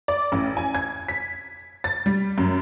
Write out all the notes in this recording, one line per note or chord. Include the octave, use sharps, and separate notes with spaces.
D5
A1
G#5
G#6
B6
A6
G3
F#2